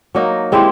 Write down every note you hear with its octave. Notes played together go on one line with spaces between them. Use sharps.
F#3 A#3 D#4
G#3 C4 E4 G4